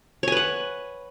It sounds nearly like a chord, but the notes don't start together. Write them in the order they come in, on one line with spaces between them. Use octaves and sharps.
C#5 G#5 B4 F#5